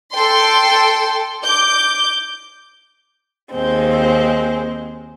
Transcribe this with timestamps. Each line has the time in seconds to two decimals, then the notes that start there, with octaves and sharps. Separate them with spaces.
0.13 A4 G5 C6
1.43 D6 G6
3.52 D#2 G#3 C4